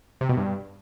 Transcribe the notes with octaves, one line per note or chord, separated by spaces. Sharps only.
C3
B2
G2